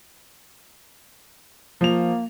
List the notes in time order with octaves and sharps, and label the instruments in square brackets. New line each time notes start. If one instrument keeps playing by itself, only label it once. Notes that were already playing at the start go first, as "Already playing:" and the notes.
[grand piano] F3 F7 [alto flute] A#3